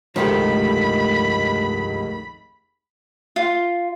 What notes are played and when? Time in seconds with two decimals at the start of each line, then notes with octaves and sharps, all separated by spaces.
0.16 F1 C#2 G2 D#3 F3 A3 B5
3.36 F4